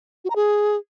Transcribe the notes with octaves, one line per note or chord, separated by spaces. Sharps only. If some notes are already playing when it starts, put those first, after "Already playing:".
F#4
A#5
G#4